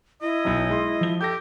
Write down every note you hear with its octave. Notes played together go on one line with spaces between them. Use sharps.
E4 D#5
B1 F#3
G#3 C6
F3 G7
G4 A4 G6 A#6